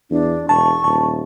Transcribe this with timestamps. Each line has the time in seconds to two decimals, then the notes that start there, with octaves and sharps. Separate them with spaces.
0.11 E2 D4
0.49 E1 A5 C#6
0.84 D#1 A5